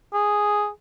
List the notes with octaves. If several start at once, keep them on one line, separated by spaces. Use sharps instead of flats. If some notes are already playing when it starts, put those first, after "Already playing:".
G#4